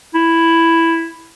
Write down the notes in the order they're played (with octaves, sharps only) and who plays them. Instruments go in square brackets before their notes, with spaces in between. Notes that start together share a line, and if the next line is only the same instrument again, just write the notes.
[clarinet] E4